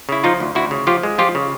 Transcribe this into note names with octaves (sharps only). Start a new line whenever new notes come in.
C#3 E4
F3 D#4 F4
D2
D2 E4 F#4
C#3
F3 F4 G4
G#3
F3 F4 G4
C#3